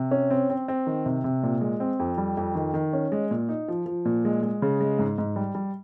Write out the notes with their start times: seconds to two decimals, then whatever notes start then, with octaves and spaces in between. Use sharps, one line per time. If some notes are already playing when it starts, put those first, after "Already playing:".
Already playing: C3
0.11 C#4
0.30 C4
0.50 C4
0.68 C4
0.87 D#3
1.06 C3
1.24 C3
1.43 A#2
1.61 G#3
1.80 C4
1.99 F2
2.18 G3
2.37 F2
2.55 D#3
2.74 D#3
2.93 C#4
3.12 G#3
3.31 A#2
3.49 D#4
3.68 F3
3.86 F3
4.05 A#2
4.25 G#3
4.42 G#3
4.62 C#3
4.80 G#3
4.99 G#2
5.18 G#2
5.36 G3
5.55 G3